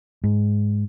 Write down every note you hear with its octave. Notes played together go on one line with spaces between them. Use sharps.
G#2